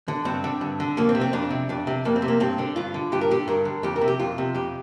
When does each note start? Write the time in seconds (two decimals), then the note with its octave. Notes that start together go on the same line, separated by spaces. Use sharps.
0.08 D3
0.25 G2 C4
0.44 D3
0.61 G2
0.80 D3
0.97 F2 A#3
1.09 C4
1.15 C3
1.21 C4
1.33 F2 D4
1.51 C3
1.69 F2 D4
1.87 C3
2.05 F2 A#3
2.16 C4
2.22 C3
2.28 A#3
2.40 G2 C4
2.58 D3 D4
2.76 G2 F4
2.94 D3
3.12 G2 G4
3.21 A#4
3.31 D3 G4
3.48 G2 A#4
3.65 D3
3.83 F2 G4
3.96 A#4
4.01 C3
4.08 G4
4.19 F2 F4
4.38 C3
4.54 F2 G4